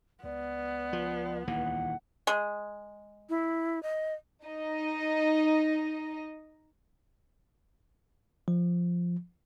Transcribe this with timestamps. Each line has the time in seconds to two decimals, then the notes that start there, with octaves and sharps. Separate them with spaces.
0.24 C#2 B3 D5
0.93 F3
1.47 D#2 A#2 E3 F#5
2.27 G#3
3.29 E4
3.83 D#5
4.44 D#4 D#5
8.48 F3